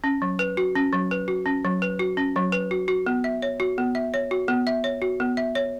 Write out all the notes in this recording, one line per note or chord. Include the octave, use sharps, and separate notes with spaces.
C#4
F#3
B4
F#4
C#4
F#3
B4
F#4
C#4
F#3
B4
F#4
C#4
F#3
B4
F#4
F#4
B3
E5
C#5
F#4
B3
E5
C#5
F#4
B3
E5
C#5
F#4
B3
E5
C#5